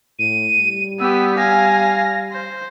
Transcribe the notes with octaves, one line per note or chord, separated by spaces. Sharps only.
A2 D#7
G3
B3 G4 E6
F5 G#5 A#6
C5